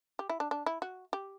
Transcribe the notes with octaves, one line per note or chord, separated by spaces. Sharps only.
G4
E4
D4
D4
E4
F#4
G4